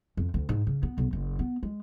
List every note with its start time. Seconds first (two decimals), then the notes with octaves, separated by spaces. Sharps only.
0.17 F2
0.34 D2
0.49 G#2
0.67 C#3
0.83 B3
0.98 B1
1.13 F#1
1.39 B3
1.63 G#3